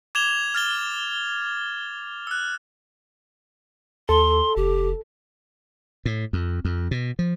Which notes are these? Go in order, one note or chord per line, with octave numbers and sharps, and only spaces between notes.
D6 G#6 E7 F7 G7
F6 A6 G7
E6 F#6
D#2 A4 C6
F1 G4
A2
F2
F2
B2
F3